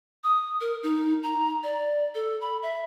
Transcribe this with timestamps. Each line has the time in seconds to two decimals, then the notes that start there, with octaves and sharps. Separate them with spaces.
0.24 D#6
0.61 A#4
0.83 D#4
1.23 A#5
1.63 D5
2.15 A4
2.41 B5
2.63 E5